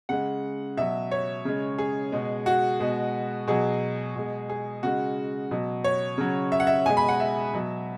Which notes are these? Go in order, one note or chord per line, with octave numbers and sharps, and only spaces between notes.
C#3 G#3 F#5
B2 F#3 E5
C#5
C#3 G#3
G#4
B2 G#3
F#4
B2 G#3
B2 F#3 G#4
B2 G#3
G#4
C#3 G#3 F#4
B2 F#3
C#5
C#3 F#3
E5
F#5
E5
B2 G#3 G#5
B5
F#5
E5
B2 F#3